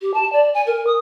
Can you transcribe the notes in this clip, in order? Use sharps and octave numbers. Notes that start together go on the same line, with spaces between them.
G4
A5
D5
G#5
A#4
D#6